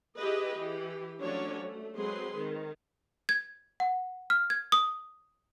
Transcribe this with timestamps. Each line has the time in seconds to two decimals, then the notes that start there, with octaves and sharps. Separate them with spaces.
0.16 E4 G4 G#4 B4 D#5
0.56 E3 G4
1.20 F3 F#3 A3 C#4 D4 C#5
1.62 A3
1.97 F#3 G#3 C4 G#4 B4 C6
2.39 D#3
3.29 G#6
3.80 F#5
4.30 F6
4.50 G#6
4.72 D#6